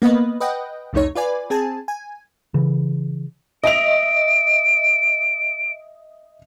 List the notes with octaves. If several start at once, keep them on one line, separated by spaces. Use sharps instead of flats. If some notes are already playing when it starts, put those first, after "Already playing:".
A#3 B3 B4 D#5
B4 D#5 F#5 G5
C2 F2 C3 A3 D#4 C#5
F4 B4 D5 G#5
C4 G#4 G#5 A5
G#5
C#3 E3
D#5 E5 D7 F7